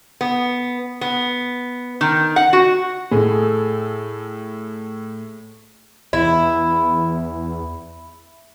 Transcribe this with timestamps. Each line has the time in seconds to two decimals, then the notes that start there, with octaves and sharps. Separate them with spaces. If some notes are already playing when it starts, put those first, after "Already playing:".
0.21 B3
1.01 B3
2.01 D#3
2.36 F#5
2.53 F#4
3.12 A2 G#4 A4
6.13 E2 E4